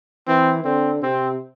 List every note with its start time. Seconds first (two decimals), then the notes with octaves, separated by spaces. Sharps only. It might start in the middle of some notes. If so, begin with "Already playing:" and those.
0.28 E3 C4
0.64 D3 C4
1.02 C3 C4